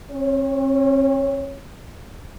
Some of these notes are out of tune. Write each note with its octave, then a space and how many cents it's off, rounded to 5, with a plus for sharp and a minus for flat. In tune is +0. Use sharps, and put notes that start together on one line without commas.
C4 +45 C#5 +0